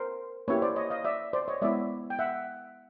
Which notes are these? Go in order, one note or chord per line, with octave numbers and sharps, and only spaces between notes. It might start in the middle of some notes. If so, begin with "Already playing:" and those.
Already playing: A#4 C5
A#3 C#4 E4 G4 B4 C#5
C5 D5
C#5 D#5
D#5 F5
D5 E5
C5 D5
C#5 D#5
G#3 B3 E4 D5 E5
G5
E5 F#5